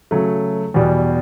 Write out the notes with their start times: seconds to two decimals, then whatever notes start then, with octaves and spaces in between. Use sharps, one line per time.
0.11 C#3 F#3 A3
0.74 E2 B2 G3